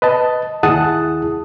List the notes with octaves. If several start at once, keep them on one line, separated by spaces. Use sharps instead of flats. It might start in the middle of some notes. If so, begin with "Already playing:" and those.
B4 D#5 A5
D#2 E4 G#4 F#5 A5 D#6